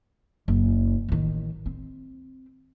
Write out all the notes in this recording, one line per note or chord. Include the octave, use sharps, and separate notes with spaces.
F#1
A1 D#3
C4